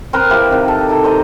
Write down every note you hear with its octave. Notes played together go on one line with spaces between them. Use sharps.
C4 A#4 B4
F3 E4 G4 B4
C3 D#3
A4
D#4 A4
C5 D#5 A#5